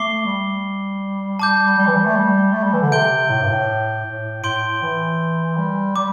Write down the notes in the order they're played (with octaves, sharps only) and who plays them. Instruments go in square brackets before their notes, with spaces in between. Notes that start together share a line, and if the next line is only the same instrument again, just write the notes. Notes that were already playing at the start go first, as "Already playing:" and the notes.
Already playing: [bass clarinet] A3 [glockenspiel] D6 C7 G7
[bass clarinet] G3
[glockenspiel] A5 D6 G6
[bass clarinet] G3
E3
G3
A3
G3
A3
G3
E3
D3
[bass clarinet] C3 [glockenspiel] G6 D7 G7
[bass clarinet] A2
G2
A2
A2
[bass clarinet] A2 [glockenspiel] C6 G6 D7 G7
[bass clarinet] E3
G3
[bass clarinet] G3 [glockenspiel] D6